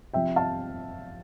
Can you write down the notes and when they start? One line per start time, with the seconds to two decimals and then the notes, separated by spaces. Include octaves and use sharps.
0.13 C3 F3 E5 G5
0.36 F5 A5